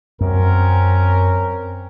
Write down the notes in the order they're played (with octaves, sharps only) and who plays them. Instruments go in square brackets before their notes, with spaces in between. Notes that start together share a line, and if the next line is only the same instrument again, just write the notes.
[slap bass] F#2 [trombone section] C4 C#4 A#4